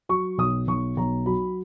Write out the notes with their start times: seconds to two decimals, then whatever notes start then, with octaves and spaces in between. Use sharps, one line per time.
0.09 F#3 C#6
0.38 B1 D#6
0.67 B1 C#6
0.97 B1 A#5
1.26 F#3 B5